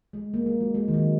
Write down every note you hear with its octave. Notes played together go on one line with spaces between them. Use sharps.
G#3
A#3
G#3
F#3
G#3
D#3
F#3